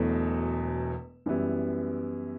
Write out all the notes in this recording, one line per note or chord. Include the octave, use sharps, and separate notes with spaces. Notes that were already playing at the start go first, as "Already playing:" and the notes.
Already playing: E1 E2 B2 F#3 A3
F#2 E3 G3 B3 E4